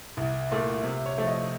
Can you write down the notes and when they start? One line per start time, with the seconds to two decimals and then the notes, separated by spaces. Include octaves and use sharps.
0.17 C2
0.51 A#2 A3
0.84 C3
1.06 C#5
1.18 F3 A3
1.28 D#5